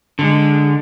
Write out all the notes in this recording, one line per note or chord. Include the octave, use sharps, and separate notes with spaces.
D3 G#3